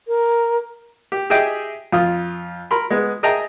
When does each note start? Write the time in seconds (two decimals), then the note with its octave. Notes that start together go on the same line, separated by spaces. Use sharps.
0.08 A#4
1.12 G4
1.30 G4 G#4 D#5 E5 G5
1.92 F2 F4 D#6
2.71 A#4 B5 C6
2.90 G#3 B3
3.23 G#4 D#5 E5 G5 A5 A#5